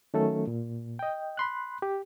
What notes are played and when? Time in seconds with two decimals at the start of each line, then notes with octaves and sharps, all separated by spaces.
0.14 D#3 F#3 A3 C#4 A4
0.47 A#2
0.99 D#5 G5
1.37 B5 C6 F#6
1.82 G4